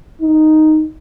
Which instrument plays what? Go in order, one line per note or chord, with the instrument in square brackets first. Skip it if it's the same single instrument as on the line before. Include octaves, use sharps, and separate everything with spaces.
[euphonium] D#4